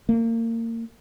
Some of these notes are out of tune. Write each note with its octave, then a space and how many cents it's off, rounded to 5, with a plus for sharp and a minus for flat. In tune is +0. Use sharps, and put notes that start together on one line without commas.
A#3 -30